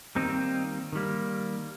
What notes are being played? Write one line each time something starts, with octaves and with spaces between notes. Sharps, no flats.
D#3 G3 A#3 C4 D#4
D#3 G3 A#3